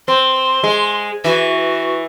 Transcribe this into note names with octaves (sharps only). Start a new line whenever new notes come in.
C4 C6
G#3
E3 F#4